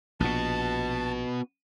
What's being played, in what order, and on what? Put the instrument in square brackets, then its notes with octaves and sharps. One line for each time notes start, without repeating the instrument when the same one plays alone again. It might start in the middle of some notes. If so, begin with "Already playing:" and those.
[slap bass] A#1 B2 [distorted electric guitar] B3 F#4 [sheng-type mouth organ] A5